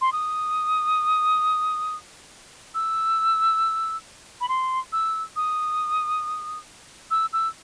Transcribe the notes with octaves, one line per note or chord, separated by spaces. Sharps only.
C6
D#6
E6
B5
C6
E6
D#6
E6
E6